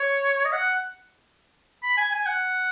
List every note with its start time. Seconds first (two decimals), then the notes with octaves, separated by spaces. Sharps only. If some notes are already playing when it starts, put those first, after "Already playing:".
Already playing: C#5
0.45 D#5
0.53 F#5
1.83 B5
1.97 G#5
2.12 G#5
2.26 F#5